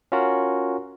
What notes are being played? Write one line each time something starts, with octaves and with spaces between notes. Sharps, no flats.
C#4 F4 F#4 A#4